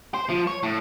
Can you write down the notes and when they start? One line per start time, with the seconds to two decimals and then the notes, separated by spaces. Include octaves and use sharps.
0.14 C5
0.30 F3
0.47 C#5
0.63 A2